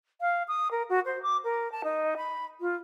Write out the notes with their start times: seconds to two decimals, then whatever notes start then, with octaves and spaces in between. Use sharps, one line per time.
0.21 F5
0.48 D#6
0.71 A#4
0.89 F#4
1.05 C5
1.23 D6
1.44 A#4
1.72 A5
1.84 D#4
2.17 B5
2.61 F4